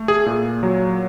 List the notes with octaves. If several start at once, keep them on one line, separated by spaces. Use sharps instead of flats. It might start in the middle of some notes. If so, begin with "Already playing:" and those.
Already playing: A3
G#4
A#2
F#3